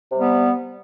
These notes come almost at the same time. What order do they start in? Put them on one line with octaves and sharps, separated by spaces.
C3 G3 B3